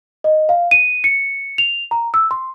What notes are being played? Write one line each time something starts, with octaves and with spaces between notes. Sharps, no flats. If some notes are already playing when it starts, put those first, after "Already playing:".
D#5
F5
D#7
C#7
F7
A#5
E6
C6